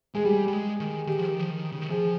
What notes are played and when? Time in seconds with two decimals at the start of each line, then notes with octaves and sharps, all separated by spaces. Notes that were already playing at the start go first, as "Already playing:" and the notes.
0.14 G#3 G#4
0.25 G3 G4
0.48 G3
0.53 G#3
0.80 D#3
1.07 D#3 G4
1.19 F3
1.28 D#3
1.39 F3
1.50 D#3
1.72 C#3
1.81 D#3
1.90 F3 G#4